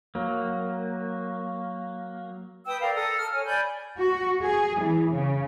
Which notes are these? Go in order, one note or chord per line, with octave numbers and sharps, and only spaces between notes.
F#3 A#3
B4 G5 D#6 E6
A#4 D5 F5 G5
A4 A#5 D#6
F6
C#5 G#5
D5 G#5 B5 G6
F#4
G#4
E3
C#3